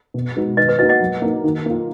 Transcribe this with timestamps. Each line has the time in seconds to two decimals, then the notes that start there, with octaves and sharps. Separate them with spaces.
0.14 B2
0.36 G#3 B3 D#4 F#4
0.57 D#3 B4 D#5
0.68 B4 D#5
0.79 F#4 B4 D#5
0.82 A#3 D#4
0.89 D#5 F#5
1.01 F#3
1.22 A#3 D#4
1.44 D#3
1.66 A#3 F4